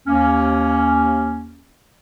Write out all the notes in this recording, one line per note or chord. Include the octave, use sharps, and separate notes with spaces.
D#2 A#3 C#4